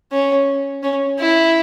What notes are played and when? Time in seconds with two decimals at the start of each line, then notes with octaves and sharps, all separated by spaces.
0.12 C#4
0.83 C#4
1.19 E4